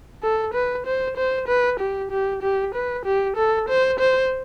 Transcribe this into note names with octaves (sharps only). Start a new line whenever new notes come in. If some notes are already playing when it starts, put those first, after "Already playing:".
A4
B4
C5
C5
B4
G4
G4
G4
B4
G4
A4
C5
C5